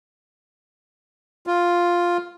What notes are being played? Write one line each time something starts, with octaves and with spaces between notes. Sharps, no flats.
F4